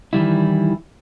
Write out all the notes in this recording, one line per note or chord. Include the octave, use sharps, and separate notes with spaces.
D#3 E3 G3 E4